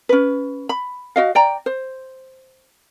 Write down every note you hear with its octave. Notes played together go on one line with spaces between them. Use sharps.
C#4 B4
B5
F#4 D#5 F5
D5 G5 A#5
C5